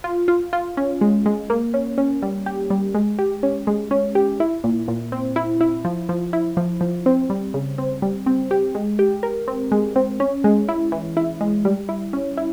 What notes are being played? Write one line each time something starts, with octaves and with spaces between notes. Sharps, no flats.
F4
F4
F4
C#4
G#3
G#3
A#3
C#4
C#4
G3
G4
G3
G#3
G4
C#4
G#3
C#4
G4
E4
A#2
A#2
C4
E4
E4
F3
F3
E4
F3
F3
C4
G3
C#3
C4
G3
C4
G4
G#3
G4
A#4
C4
G#3
C4
C#4
G#3
E4
E3
E4
G#3
G3
E4
C#4
E4